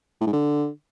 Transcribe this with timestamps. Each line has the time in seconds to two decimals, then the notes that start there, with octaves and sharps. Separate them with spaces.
0.21 A2
0.27 G#2
0.33 D3